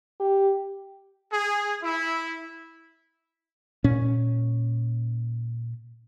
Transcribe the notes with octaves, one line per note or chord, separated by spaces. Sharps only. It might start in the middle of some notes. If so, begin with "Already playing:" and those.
G4
G#4
E4
A#2 C#4